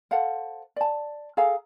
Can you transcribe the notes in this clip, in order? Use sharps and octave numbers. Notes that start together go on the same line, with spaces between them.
A4 C5 F5 F#5
D5 A5
G#4 A4 F5 A#5